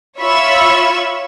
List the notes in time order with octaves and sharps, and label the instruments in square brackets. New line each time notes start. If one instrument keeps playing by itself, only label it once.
[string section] F4 C#5 E5 B5 C#6 E6